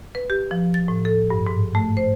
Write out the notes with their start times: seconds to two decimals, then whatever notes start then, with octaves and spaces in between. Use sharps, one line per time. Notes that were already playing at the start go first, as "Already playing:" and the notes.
0.15 B4
0.30 G4
0.51 F3
0.74 A6
0.88 A2
1.05 A4
1.30 G2
1.47 G#2
1.75 A3
1.97 C5